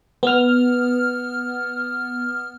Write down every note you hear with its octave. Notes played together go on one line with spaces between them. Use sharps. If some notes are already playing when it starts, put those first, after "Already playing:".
B3 F6